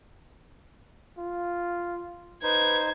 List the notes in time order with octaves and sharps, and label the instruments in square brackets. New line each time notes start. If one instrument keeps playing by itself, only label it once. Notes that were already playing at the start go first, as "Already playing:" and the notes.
[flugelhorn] F4
[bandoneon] D#4 C5 [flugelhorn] B4 [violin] G#6